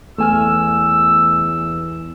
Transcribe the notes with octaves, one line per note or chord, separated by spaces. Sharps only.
E2 A3 G#5 E6 F6